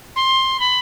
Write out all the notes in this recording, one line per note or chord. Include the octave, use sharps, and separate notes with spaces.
C6
B5